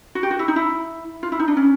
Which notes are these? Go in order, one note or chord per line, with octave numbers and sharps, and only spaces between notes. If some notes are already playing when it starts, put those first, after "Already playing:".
F#4
G4
F#4
E4
D#4
E4
F4
E4
D#4
D4
C#4